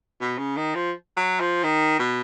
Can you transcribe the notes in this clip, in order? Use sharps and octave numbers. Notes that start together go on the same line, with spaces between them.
B2
C#3
D#3
F3
F#3
F3
D#3
B2